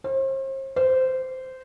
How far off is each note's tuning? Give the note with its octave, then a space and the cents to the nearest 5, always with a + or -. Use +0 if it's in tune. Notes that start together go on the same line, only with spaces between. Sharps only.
C5 +40
C5 -15